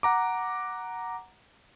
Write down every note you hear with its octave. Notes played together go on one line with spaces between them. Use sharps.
F#5 A#5 D6